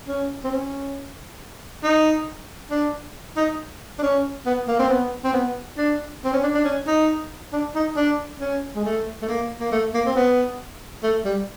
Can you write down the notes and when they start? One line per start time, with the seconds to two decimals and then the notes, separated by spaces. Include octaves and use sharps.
0.08 C#4
0.44 C4
0.51 C#4
1.84 D#4
2.71 D4
3.37 D#4
3.99 D4
4.03 C#4
4.46 B3
4.68 A#3
4.79 C4
4.89 B3
5.24 C4
5.33 B3
5.78 D4
6.25 C4
6.33 C#4
6.43 D4
6.55 D4
6.65 C#4
6.87 D#4
7.53 D4
7.75 D#4
7.96 D4
8.40 C#4
8.75 G#3
8.85 A3
9.22 A3
9.28 A#3
9.60 A#3
9.72 A3
9.94 A#3
10.06 C4
10.16 B3
11.03 A3
11.25 G3